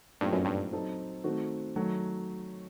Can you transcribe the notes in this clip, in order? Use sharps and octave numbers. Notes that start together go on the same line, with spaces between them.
G2 A#2 F#3 A3 C4 D#4
F#2
G2
F#3 C4 D#4 A4
D#3 A3 C4 F#4
D#3 F#3 A3